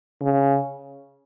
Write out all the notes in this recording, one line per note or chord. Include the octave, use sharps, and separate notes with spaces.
C#3